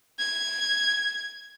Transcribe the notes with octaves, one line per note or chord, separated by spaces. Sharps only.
G#6